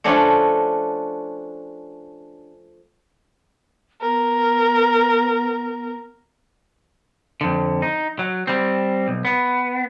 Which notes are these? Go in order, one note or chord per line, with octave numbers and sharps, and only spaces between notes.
F3 A3 C#4 D4 F#4
B3 A#4
F2 D3
D#4
F#3
G3 C4
B1
B3